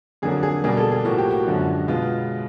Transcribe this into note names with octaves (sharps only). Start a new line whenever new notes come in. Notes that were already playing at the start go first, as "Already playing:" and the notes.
F2 D3 F#3 A#3 G#4
G#4
B2 G3 A#3 G#4
A4
G#4
A2 F3 A#3 F#4
G4
F#4
F#2 D3 F3 G#3
B2 G#3 B3 F4